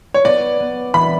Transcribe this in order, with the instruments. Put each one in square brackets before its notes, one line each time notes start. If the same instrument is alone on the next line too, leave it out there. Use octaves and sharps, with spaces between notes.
[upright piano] C#5
[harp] B3 [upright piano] D5
[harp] B3
[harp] E3 [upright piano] B5